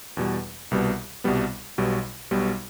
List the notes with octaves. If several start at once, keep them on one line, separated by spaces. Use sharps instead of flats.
E2 B2 G3
C2 B2 G3 B3
C2 B2 G3 B3
B1 B2 G3
B1 B2 G3